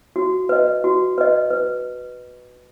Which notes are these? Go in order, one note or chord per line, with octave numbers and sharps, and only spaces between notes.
F#4
B4 D#5
F#4
B4 D#5
B4